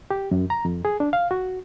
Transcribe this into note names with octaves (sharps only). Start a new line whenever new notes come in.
G4
F#2
A#5
F2
G#4
D4
F5
F#4